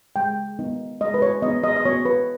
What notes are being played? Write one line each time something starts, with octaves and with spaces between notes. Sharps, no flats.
G#3 G5
B3 D#4
G#3 D#5
B4
C#5
B3 D#4 D#5
D#5
D#5
B3 C#5
B4